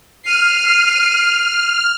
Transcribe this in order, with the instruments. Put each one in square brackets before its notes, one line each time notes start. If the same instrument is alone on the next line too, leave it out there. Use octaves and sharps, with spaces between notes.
[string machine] F6 [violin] C7 D#7